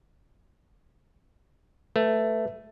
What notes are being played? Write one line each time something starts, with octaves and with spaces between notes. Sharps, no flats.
A3 B4 E5